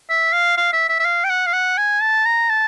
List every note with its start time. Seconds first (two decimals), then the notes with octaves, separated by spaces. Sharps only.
0.10 E5
0.33 F5
0.57 F5
0.73 E5
0.89 E5
1.00 E5
1.05 F5
1.24 G5
1.29 F#5
1.47 F5
1.53 F#5
1.78 G#5
2.02 A5
2.25 A#5
2.49 A5